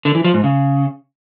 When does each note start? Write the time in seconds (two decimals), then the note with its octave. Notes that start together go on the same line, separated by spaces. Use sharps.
0.05 D3
0.15 E3
0.24 F3
0.34 G#2
0.44 C#3